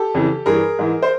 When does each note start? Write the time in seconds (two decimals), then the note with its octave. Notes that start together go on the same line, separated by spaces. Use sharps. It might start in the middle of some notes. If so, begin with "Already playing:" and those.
Already playing: G4 A4
0.14 F2 C#3 E3
0.46 G2 E3 G#4 A#4
0.79 G#2 E3
1.03 C5